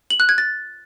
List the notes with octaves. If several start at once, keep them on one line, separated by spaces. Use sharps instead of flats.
F#7
F#6
G#6
A6